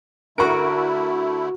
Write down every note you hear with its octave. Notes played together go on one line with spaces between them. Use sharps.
D3 A3 E4 F#4 A#4 F#5 C#6 D7